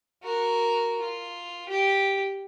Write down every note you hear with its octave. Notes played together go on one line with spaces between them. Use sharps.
F#4 A#4
F4
G4